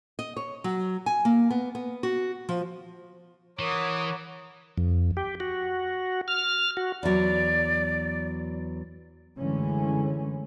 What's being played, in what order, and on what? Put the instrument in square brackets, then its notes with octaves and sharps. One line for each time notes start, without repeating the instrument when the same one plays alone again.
[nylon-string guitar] D#5
C#5
F#3
G#5
A#3
B3
B3
F#4
F3
[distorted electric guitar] E3 [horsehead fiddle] A#4 F#5 [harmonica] C#5 [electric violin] D6 D#6
[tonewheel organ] F2
G4
F#4
F6
F#4
[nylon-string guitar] E2 F#3 [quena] D5
[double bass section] F#2 D3 E3 G#3 A3 C#4